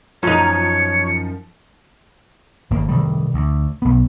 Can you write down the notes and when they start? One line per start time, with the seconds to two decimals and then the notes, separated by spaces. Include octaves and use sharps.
0.23 F#2 F3 D#4 C#5 C#7
2.71 G#1 A#3
2.89 C3 D#3 G3
3.34 D2
3.82 B1 B3